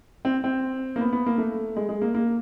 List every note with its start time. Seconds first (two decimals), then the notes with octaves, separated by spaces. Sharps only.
0.25 C4
0.44 C4
0.96 A#3
1.01 B3
1.13 B3
1.26 A#3
1.38 A3
1.76 G#3
1.89 G#3
2.01 A#3
2.14 A#3